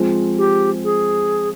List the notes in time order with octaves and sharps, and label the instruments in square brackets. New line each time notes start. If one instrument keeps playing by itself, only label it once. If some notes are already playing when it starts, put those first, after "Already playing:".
Already playing: [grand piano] F3 G#3 C4 F4
[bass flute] G4
G#4